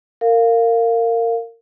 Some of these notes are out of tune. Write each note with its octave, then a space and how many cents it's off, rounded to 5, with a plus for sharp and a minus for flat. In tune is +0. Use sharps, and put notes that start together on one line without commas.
A#4 -25 F5 +0